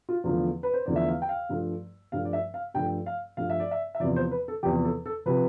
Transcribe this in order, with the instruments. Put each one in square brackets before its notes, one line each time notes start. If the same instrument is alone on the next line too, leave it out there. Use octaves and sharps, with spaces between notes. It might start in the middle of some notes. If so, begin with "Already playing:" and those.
[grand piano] F4
E2 D3 F3 A3 F4
B4
C5
E2 D3 F3 A3 D5
E5
F5
G5
F5
G2 F3 A3
G2 F3 A3 F5
D5
E5
F5
G2 F3 A3 G5
F5
G2 F3 A3 F5
E5
D5
E5
E5
E2 C3 F3 D5
C5
B4
A4
E2 C3 F3 G4
A4
A4
C3 F3 B4